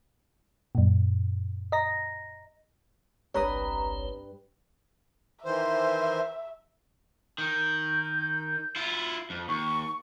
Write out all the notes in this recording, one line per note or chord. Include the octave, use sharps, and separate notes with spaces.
F#2 A#2
D#5 A#5 A#6
G1 C2 G2 C4 B4 C#5 A#5 D#6
D#3 E3 C5 E5
D#3 G6
E4 F4
F2
D#2 C#6